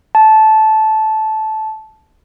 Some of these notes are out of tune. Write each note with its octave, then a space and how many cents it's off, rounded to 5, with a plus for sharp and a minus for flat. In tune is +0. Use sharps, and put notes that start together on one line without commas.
A5 -15